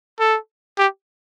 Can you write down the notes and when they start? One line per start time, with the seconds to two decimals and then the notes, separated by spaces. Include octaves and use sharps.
0.20 A4
0.78 G4